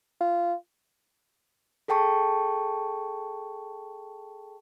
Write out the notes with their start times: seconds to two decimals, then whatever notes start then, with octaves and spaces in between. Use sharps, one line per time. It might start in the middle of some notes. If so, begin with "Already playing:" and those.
0.21 F4
1.88 G#4 A4 G5 A5 C#6